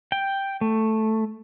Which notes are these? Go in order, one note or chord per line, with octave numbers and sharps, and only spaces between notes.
G5
A3